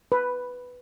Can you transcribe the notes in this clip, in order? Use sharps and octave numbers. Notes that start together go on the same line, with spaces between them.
B4